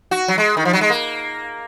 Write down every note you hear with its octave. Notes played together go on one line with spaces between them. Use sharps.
F#4
F#3
G#3
D#3
F3
F#3
G#3
A#3